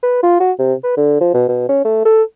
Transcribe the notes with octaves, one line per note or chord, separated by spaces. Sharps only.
B4
F4
F#4
C3
B4
D3
F3
B2
B2
C#4
A3
A4